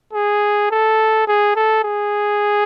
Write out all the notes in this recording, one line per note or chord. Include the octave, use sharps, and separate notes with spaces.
G#4
A4
G#4
A4
G#4